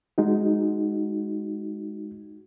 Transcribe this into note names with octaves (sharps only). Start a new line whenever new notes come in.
G#3 D#4 F#4